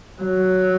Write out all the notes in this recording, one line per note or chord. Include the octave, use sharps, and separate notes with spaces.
F#3